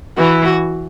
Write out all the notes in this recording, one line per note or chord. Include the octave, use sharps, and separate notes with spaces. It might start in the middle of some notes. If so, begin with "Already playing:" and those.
E3 F#4
F#4